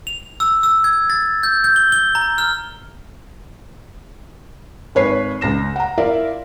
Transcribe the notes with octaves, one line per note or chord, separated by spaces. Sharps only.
F7
E6
E6
G#6
A6
G6
G6
G7
G7
A#5
F6
G#1 B4 C#5 C7
C#2 A#6 E7
F#5 A#5
E4 F4 A#4 D5 E5 F5